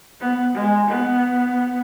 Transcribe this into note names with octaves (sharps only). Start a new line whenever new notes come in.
B3
G#3
B3